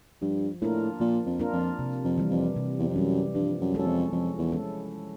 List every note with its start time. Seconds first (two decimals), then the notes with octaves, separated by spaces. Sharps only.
0.22 G2 F3
0.62 A2 A#3 D4 F4 A#4
1.00 A#2 F3
1.26 F2
1.39 A#3 D4 F4 A#4
1.53 F2
1.79 C3
2.05 F2
2.18 E3 G3
2.31 F2
2.56 C3
2.79 E2
2.88 F2
2.95 F#2 E3 G3
3.35 G2 F3
3.61 F#2
3.74 F#2 G#3 C#4 E4 A4
3.87 F2
4.13 F2 F3
4.39 E2
4.52 G#3 C#4 E4 A4